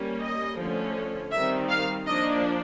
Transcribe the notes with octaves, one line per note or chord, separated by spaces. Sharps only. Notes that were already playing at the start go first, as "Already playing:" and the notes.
Already playing: G3 A#3 C#4
D#5
D3 F3 A3 C#4
D#3 G3 C4 E5
F5
F3 A#3 D4 D#5